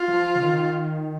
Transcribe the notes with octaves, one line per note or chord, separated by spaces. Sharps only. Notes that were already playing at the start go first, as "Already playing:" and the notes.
Already playing: F4
F3
C#3
D#3